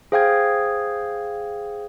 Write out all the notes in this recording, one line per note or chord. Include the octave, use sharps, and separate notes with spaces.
G#4 C5 F5 G5 D#6 G#6